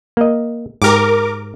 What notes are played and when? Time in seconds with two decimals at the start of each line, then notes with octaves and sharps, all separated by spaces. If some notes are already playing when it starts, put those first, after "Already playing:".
0.17 A#3 D#5
0.82 G#2 G4 A#4 D6